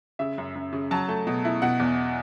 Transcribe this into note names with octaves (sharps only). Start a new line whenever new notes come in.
C#3 E5
F#2
F#2
C#3
F#3 A5
A3
B2
E4
B2 F#5
E2